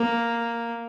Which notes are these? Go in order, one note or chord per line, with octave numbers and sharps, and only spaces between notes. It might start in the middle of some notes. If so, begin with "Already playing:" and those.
Already playing: A#3